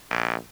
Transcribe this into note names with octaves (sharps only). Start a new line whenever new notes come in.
A#1